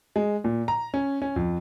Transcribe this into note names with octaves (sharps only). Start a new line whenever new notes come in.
G#3
A#2
A#5
C#4
C#4
F2